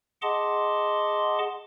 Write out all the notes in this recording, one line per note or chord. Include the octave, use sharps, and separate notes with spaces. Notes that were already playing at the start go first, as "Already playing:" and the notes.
G#4 D#5 F#5 A5 C6 D6